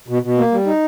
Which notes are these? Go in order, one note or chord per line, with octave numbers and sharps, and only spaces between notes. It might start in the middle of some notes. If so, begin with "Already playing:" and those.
B2
B2
A#3
G3
D#4